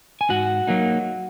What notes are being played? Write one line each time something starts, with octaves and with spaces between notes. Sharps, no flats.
G#5
G#2 F#4 F#5
F#3 A#3 D#4